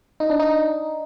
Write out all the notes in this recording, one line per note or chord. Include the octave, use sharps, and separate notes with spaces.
D#4
D4
D#4